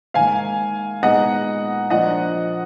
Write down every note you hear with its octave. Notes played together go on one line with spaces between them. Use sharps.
G#2 D#3 A#3 F5 G#5
A#2 G#3 B3 D#4 D#5 F#5
A#2 F3 A#3 D4 F4 D#5 F#5